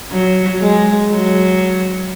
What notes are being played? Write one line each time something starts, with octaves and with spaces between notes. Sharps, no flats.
F#3
G#3
F#3